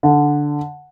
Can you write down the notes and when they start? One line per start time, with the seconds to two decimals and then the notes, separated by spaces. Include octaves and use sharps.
0.03 D3